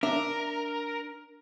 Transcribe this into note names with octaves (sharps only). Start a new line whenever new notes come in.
D4 A#4 E5